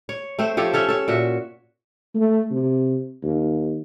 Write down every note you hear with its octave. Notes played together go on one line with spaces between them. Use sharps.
C#5
A3 C4 C5
F3 G4 A4 C#5
C#4 A4 C#5 E5
A4 C#5
A#2 F#4 E5
A3
C3
D#2